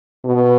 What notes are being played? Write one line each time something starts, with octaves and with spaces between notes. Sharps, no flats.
B2